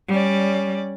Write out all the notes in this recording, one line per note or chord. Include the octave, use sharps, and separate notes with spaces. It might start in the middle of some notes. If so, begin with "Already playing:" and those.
G3 C#4 D5